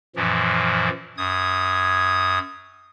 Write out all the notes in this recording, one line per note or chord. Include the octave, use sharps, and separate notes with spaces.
F#2 A#2 E3 F3
F#2 D#6 G#6